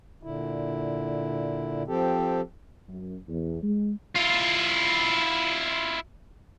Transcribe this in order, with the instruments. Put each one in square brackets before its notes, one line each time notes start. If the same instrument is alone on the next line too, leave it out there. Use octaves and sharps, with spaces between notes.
[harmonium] A#2 D3 E4
F3 C4 G4 A4
[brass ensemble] F#2
E2
G#3
[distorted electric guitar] E4 F4